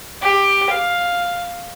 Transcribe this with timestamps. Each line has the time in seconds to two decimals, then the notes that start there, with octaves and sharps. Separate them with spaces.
0.22 G4
0.70 F5